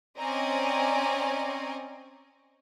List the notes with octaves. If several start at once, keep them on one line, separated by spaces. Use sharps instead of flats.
C4 C#4 D5 D#5 G#5 A#5